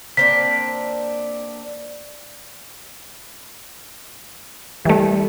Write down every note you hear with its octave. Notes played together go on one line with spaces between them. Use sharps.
A#3 C4 D4 B6
E3 G3 A3